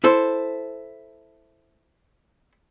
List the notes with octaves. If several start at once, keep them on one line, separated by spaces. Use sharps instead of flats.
E4 A4 C5